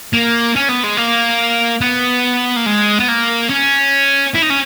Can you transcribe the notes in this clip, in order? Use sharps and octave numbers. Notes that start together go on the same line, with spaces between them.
A#3
C#4
B3
G#3
A#3
B3
A#3
G#3
B3
A#3
C#4
E4
D#4
C#4